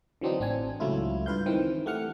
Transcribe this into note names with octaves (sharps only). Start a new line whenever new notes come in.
D3 E3 F#3 C4 D4 D#4
A1 C4 D4 G#5
C#2 F#3 A3 E4 F4
G2 F4 B4 F5 G6
D#3 E3 C4
A3 G4 F#5 F6 C#7